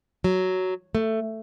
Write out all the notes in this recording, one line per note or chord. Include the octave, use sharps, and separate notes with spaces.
F#3
A3